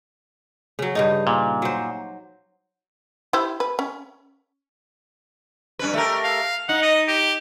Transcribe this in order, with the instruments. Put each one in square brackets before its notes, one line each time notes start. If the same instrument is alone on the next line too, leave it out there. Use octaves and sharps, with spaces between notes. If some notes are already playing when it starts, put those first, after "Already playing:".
[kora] C#3 F#3
G2 C#3 D#4
[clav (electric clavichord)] A#2
[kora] F#3 C5
[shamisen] E4 G4 C5
B4
C#4
[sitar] G2 C#4 B4
A3 G4 A#4
[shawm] F5
[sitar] D#4 [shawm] F#5
[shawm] D#5
G4